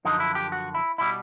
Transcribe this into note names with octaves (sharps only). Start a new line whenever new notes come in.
F#2 D3 F3 D#4
E4
G4
F#4
E4
B2 G3 E4